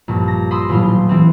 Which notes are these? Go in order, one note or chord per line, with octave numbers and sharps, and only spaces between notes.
A#1 G2
A#6
B5 C6 D#6 E6
D#1 A2 F#3 F4 C6
E3 C4